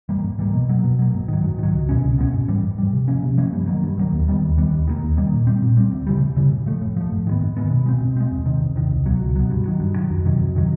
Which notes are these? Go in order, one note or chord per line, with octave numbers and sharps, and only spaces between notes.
E3 G3 A#3
G#2
E3 G3 A#3
B2
F#3 A#3
B2
F#3 A#3
G#2
D#3 F#3
G#2
D#3 F#3
C#2
B2 G#3 C#4
C#2
B2 G#3 C#4
G#2
E3 G3
G#2
E3 G3
C3
F3 A#3 C#4
C3
F3 A#3 C#4
G2
D#3 F#3 A#3
G2
D#3 F#3 A#3
D#2
D#3 G3 B3
D#2
D#3 G3 B3
D#2
D#3 G3 A#3
D#2
D#3 G3 A#3
A#2
G3 C4
A#2
G3 C4
D2
C#3 E3 G3
D2
C#3 E3 G3
A2
F3 A3
A2
F3 A3
G#2
D#3 G#3 B3
G#2
D#3 G#3 B3
B2
G#3 C4
B2
G#3 C4
E2
C3 D#3
E2
C3 D#3
C#2
B2 F#3
C#2
B2 F#3
G2
D#3 F#3
G2
D#3 F#3
F2
C3 D#3 F#3
F2
C3 D#3 F#3